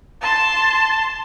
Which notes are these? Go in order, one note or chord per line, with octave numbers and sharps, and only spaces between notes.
A5 C6